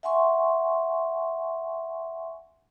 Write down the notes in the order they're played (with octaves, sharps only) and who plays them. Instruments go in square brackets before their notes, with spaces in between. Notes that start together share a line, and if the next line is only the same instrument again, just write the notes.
[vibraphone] E5 F#5 G#5 C6 C#6